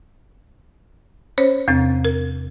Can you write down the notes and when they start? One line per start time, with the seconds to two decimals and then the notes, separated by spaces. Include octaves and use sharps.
1.38 C#4 C5 C#5
1.68 E2 C3 C4 A6
2.05 A#4